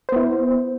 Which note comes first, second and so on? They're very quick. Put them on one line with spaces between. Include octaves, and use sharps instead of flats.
C5 B3 E4